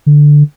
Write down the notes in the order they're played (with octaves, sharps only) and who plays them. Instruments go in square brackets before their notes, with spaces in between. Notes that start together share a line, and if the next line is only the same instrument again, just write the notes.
[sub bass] D3